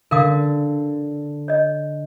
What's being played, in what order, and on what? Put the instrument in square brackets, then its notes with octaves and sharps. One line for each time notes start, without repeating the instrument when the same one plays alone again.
[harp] D3 [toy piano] A#4 F5 D#6
[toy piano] C#5 D#5